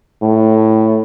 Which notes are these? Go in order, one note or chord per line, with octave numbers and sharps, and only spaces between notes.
A2